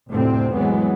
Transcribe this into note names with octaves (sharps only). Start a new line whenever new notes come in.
F1 D2 A2 C3 C4
E3 F#3 G#3 B3